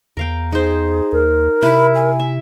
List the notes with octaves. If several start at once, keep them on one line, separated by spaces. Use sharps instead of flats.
E2 A#4 F5 G5
D#4 G#4 C5
D#2 A#4
C3 E4 B5
G#5
E5